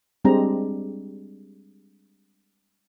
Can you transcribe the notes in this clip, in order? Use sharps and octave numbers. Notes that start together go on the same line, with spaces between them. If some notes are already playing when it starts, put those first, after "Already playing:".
G3 G#3 C4 D4 G4 A#5